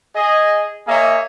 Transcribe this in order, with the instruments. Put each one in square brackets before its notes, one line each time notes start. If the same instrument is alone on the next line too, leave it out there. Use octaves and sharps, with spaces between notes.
[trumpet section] G#4 D#5
A#3 G#4 C#5 D#5 E5